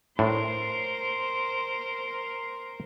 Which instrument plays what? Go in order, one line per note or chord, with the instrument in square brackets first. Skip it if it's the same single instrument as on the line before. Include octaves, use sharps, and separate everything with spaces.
[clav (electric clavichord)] A2 D4 [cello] A#4 C5 [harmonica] C6